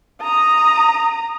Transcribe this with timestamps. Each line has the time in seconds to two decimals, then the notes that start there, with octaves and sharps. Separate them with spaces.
0.22 A#5 D#6